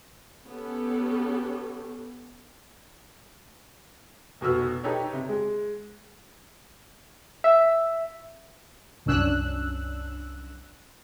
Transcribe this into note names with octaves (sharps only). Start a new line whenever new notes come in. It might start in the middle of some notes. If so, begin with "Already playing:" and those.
B3 C#4 G4 A4
F1 B2 F#4 B4 E6 F6
D#4 G4 A4 B4 C#5
C3
G#3
E5
C2 F#2 C#4 D4 E6 F#6